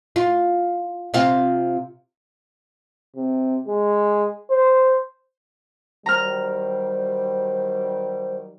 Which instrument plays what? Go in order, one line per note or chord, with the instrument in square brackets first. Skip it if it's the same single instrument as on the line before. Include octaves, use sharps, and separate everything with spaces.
[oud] F4
C3 C4 F4
[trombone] C3
G#3
C5
[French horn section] D#3 F#3 G3 [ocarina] C5 [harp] A#5 F6